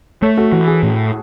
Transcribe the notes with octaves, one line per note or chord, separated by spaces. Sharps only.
A3 A4 C#5
F#4 A4
E3 F#4
G#4
A2